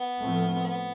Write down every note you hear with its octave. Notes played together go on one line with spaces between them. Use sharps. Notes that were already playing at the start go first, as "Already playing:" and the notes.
Already playing: B3
A2 F3 A3 C4
B3